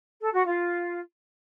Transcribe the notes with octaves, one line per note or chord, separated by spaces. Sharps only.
A4
F#4
F4